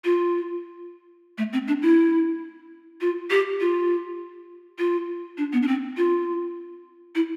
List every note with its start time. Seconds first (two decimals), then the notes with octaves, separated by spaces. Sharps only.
0.05 F4
1.38 A3
1.53 C4
1.68 D4
1.82 E4
3.01 F4
3.30 G4
3.60 F4
4.79 F4
5.38 D4
5.53 B3
5.62 D4
5.67 C4
5.97 F4
7.15 E4